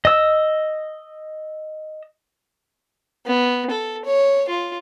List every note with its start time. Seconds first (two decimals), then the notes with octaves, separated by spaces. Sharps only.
0.05 D#5 E6
3.26 B3
3.70 A4
4.05 C#5
4.49 F4